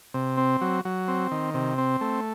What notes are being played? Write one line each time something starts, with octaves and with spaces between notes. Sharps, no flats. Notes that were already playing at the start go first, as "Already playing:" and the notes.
C3
C4
F#3
F#3
C4
D#3
C3
C4
A3